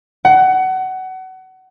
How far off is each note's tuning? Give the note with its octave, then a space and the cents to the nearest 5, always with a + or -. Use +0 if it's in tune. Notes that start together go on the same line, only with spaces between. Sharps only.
F#5 +25